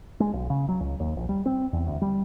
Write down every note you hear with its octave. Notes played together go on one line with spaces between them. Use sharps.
G#3
B1
C#3
F#3
C#2
D#2
A#1
G3
C4
E2
D2
G3